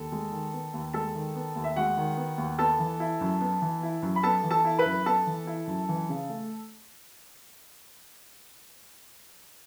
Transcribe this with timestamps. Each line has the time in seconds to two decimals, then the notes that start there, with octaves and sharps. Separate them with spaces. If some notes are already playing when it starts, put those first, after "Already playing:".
Already playing: D#2 A4
0.12 G#3
0.32 D#3
0.53 B3
0.73 D#2
0.94 G#3 A4 A5
1.15 D#3
1.35 B3
1.56 D#2
1.64 E5
1.76 G#3 F#4 F#5
1.97 D#3
2.17 B3
2.38 D#2
2.59 B3 A4 A5
2.79 E3
3.00 E4
3.21 F#2
3.41 B3
3.62 E3
3.83 E4
4.02 F#2
4.16 B5
4.23 B3 A4 A5
4.44 E3
4.51 A4 A5
4.65 E4
4.78 B4 B5
4.86 F#2
5.05 B3 A4 A5
5.27 E3
5.47 E4
5.67 F#2
5.89 E3
6.09 C#3
6.30 A3